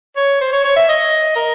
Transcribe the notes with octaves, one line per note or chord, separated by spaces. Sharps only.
C#5
C5
C#5
C#5
E5
D#5
A#4